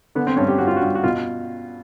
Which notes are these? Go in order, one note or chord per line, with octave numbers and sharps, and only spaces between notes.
D3 B3
C4
G2 C#4
G4
G2 F#4
F4
F#4
G2
F#4
B2 F4